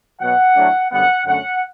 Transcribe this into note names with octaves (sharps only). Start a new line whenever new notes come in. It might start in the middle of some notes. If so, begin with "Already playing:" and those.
B2 F#3 B3 F#5
A2 F#3 A3 D4
F#2 D3 G3 B3 F#5
F#2 D3 A3 C#4 F#5